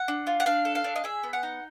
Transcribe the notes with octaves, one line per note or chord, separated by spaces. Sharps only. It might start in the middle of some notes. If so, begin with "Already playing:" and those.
Already playing: F#5
D4
F4
F#5
D4 F5
A4
F5
D4
D#5
G#4 E5
B3
F#5
D#4